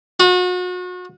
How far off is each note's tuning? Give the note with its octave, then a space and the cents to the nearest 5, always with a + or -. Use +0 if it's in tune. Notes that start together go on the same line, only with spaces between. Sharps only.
F#4 -35